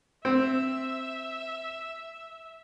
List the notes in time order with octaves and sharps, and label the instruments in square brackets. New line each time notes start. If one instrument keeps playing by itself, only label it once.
[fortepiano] C4 [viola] E5